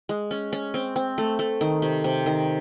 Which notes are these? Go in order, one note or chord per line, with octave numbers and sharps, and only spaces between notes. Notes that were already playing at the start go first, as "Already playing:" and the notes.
G#3
C#4
C#4
C4
C4
A3
A3
D#3
C3
C3
D#3